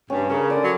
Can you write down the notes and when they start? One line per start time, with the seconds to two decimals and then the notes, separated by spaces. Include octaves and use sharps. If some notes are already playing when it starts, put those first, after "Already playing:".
0.09 G2 C#4
0.29 C#3 A#4
0.50 D3 D5
0.62 F#3